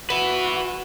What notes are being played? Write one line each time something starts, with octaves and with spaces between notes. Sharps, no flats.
B3 F#4 B4 E5